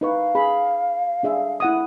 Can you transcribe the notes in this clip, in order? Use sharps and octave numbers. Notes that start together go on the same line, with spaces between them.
D#4 B4 F5 C#6
G#4 B5
D4 G#4 E5
E4 F#5 D#6